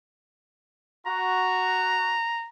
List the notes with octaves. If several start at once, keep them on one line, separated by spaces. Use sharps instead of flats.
F#4 A#5